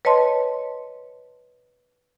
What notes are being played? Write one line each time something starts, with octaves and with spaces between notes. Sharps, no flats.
B4 C#5 D#5 A5 C6